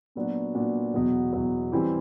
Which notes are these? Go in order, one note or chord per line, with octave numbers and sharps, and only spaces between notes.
A#2 F#3 B3 D4 F#4
A#2 F#3 B3 D4 F#4
E2 B2 F#3
E2 B2 F#3
E3 G3 C4 E4 G4